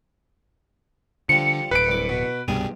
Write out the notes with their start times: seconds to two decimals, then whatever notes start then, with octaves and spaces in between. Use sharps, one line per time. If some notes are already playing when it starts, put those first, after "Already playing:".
1.29 D3 F3 G3 C#7
1.71 D1 B4 D7
1.88 C2 D6
2.09 B2
2.48 C2 G2 B2 G3 G#4 G#5